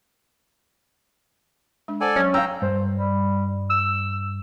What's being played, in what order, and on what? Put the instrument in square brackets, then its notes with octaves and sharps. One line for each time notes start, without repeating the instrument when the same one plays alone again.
[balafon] G#3 D4
[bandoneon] A4 D5 G#5 [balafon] C5 F#5
[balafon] F#3 [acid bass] C#4
[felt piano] F5 E6 [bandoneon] G5 A#5
[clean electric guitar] G2 [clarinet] C5
[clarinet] G3
E6